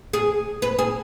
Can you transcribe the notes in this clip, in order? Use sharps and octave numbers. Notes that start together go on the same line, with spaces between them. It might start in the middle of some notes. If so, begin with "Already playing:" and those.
G#4
B4
G#4